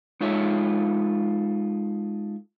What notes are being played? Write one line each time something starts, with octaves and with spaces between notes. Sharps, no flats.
G#3 D#4 F4 A4 C#5 E5